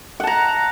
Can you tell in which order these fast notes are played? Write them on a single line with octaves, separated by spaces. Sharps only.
F#5 A5 A#5